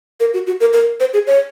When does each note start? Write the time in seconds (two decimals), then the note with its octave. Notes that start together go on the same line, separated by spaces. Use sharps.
0.20 A#4
0.34 F#4
0.47 F#4
0.60 A#4
0.73 A#4
1.00 C5
1.13 G#4
1.27 C#5